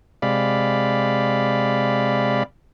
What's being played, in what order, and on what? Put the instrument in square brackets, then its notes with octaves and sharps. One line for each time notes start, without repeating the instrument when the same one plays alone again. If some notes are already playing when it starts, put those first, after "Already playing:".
[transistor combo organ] C3 G#3 D5 F5 B5